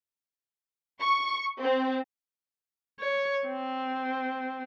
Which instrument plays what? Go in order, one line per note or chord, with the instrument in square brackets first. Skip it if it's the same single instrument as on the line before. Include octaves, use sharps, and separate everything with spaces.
[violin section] C#6
C4
[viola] C#5
C4